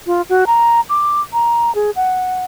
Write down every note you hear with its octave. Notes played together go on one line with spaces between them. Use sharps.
F4
F#4
A#5
D6
A#5
G#4
F#5